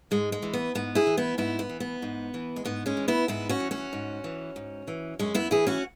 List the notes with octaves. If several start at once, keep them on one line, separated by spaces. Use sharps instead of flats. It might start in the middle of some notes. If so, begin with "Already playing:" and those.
G#2 G#3
G#3
E3
B3
G#2 B3
E4 G#4
E3
B3 E4
G#2 B3 E4
B3
E3
B3
G#2
E3
G#3
G#2 B3
G#3 C#4
E3
B3 E4
G#2 B3 E4
C#4 F#4
E3
C#4 F#4
G#2
E3
G#2
E3
F#2 G#3 C#4
B3 E4
E3 E4 G#4
C#4 F#4